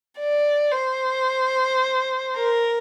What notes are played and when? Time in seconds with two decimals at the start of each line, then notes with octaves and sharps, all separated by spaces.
0.19 D5
0.72 C5
2.36 A#4